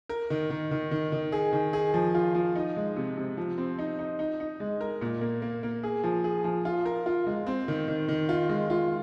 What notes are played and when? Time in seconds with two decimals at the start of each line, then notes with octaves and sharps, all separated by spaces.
0.09 A#4
0.30 D#3
0.50 D#3
0.71 D#3
0.91 D#3
1.12 D#3
1.32 G#4
1.53 D#3
1.73 G#4
1.94 F3
2.15 F4
2.35 F3
2.55 D#4
2.76 G#3
2.96 C3
3.17 C3
3.37 F3
3.58 C4
3.79 D#4
3.99 D#4
4.19 D#4
4.40 D#4
4.60 G#3
4.81 A#4
5.01 A#2
5.21 A#3
5.42 A#3
5.63 A#3
5.83 G#4
6.04 F3
6.24 G#4
6.44 F3
6.65 F4
6.85 A#4
7.06 F4
7.27 G#3
7.47 C4
7.68 D#3
7.88 D#3
8.09 D#3
8.29 F4
8.49 G#3
8.70 F4